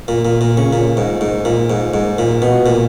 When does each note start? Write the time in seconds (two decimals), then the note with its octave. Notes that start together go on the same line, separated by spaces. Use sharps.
0.08 A#2
0.25 A#2
0.41 A#2
0.57 C#3
0.73 A#2
0.97 G#2
1.21 G#2
1.45 A#2
1.70 G#2
1.94 G#2
2.19 A#2
2.42 B2
2.66 A#2